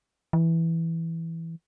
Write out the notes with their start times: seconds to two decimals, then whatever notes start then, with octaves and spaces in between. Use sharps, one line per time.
0.33 E3